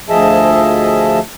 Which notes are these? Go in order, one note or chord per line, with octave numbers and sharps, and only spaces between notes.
D2 F3 G#4 D#5 E5 A5